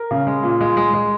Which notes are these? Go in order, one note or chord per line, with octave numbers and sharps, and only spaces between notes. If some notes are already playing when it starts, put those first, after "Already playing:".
Already playing: A#4
C#3
G#3
A#2
G#3
G#3
G#3